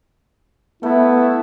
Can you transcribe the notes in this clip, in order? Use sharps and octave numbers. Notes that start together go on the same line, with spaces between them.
A3 B3 E4